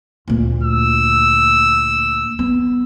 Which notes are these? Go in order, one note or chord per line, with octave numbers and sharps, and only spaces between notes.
D2 A#2
E6
B3